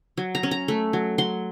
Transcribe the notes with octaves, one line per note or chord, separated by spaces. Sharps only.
F#3
A#5
C#4
A#5
A3
F#3
F#3 C6